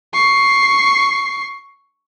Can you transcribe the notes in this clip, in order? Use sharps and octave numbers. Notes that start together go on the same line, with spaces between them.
C#6 C7